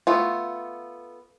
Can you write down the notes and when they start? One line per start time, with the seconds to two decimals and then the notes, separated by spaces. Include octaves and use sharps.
0.07 A3 B3 F4